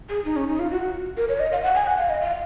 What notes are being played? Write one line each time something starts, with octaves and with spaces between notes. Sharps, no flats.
G#4
D#4
C#4
D#4
F4
F#4
A#4
C#5
D#5
F5
F#5
G#5
F#5
F5
D#5
F5